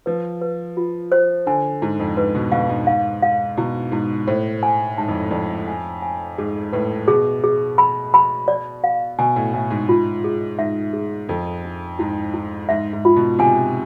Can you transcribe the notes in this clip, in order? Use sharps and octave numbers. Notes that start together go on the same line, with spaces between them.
F3 B4
B4
F4
C5
D3 G#5
G#2 E4
F2
G#2 B4
B2
B2 F5
G#2
F5
F5
B2 E4
G#2 E4
A2 C5
G#5
G#2 A5
F2
F2 D5
G#5
G#5
G#2 G#4
A2 B4
B2 G#4
G#4
B5
B5
D5
F5
B2 G#5
A2
A2 G#5
G#2
F4
G#4
G#2 E5
G#4
F2 A4
D4
G#2 E4
E4
G#2 E5
G#2
F4
B2
C3 G#5